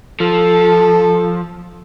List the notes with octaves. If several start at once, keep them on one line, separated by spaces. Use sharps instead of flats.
F3 A4